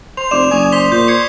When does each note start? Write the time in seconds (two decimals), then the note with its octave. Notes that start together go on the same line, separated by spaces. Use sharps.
0.17 C5 F7
0.31 F1 D5 D6 E7 F7
0.51 F#1 G#5 C#6 D#6
0.72 C5 B6 F7 G7
0.92 A#2 G6
1.08 G#6 C7 C#7